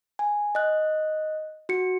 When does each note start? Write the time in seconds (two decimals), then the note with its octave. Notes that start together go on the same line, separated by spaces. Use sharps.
0.19 G#5
0.55 D#5 F#6
1.69 F#4 C#7